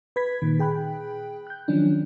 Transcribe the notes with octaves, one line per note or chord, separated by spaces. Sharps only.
B4 B5 G#6 B6
A#2 D#3
G#4 G5 B5 F#6
F#6 G6
D#3 F3 F#3 C#4 D4